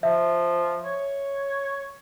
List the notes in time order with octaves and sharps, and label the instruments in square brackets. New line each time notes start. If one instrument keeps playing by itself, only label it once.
[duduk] F3 [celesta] E5
[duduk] C#5